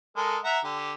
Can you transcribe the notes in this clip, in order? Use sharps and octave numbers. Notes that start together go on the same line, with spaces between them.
G#3 A4 A#4
E5 F#5 A#5
D3 G4